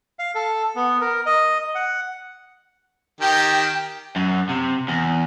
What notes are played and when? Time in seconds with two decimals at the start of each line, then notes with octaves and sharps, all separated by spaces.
0.19 F5
0.35 A4
0.76 B3
1.01 A#4
1.26 D#5
1.75 F#5
3.21 D#3 G4 G5
4.16 F#2
4.49 C3
4.88 E2